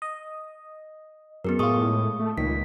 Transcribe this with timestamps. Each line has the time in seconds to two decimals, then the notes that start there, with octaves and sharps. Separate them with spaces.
0.02 D#5
1.45 F#2 B3 G#4 A#4
1.59 A2 G#3 F4 C#6 D#6
2.19 A3
2.38 C#2 A#2 D#3 B6